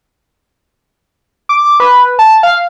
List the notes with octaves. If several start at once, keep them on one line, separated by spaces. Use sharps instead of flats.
D6
B4
A5
F5